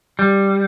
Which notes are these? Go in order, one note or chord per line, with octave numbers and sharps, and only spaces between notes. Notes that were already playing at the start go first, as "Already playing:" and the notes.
G3